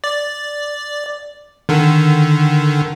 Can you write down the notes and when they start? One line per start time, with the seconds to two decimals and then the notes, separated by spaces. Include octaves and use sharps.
0.04 D5
1.69 D3 D#3